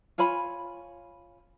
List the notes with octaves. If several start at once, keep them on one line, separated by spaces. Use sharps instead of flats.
F4 C#5 G#5 B5